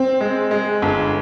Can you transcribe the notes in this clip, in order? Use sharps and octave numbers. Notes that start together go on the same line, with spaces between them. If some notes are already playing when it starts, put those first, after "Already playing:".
Already playing: C4
G#3
G#3
G1